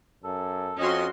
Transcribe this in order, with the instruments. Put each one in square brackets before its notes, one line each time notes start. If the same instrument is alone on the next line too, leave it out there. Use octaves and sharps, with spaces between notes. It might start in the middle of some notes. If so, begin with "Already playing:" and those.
[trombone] F#2 [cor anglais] A4
[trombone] F2 [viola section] C#4 F#4 C6 [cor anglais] D#5